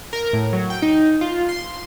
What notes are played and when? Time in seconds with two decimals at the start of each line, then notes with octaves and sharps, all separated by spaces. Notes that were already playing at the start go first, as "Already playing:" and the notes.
0.13 A#4
0.33 A2
0.53 F#3
0.70 G5
0.82 D#4
1.21 F4
1.49 C6